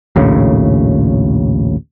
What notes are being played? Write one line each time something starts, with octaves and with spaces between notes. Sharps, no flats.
A#1 D#2 A2 C#3